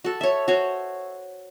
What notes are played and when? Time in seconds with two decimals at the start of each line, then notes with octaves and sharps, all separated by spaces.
0.04 F#4 A4
0.21 C#5 E5
0.48 F#4 C5 C#5